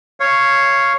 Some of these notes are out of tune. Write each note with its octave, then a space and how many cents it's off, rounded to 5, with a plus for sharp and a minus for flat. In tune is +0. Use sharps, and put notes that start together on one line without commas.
C#5 +0 F5 -10